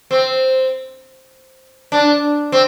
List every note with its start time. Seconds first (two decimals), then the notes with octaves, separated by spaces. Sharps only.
0.11 C4
1.92 D4
2.52 C4